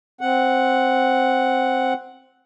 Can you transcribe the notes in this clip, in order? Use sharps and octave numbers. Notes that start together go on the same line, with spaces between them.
C4 F#5